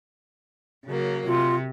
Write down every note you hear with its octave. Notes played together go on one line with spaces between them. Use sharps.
C#3 F#3 A#3
C3 F4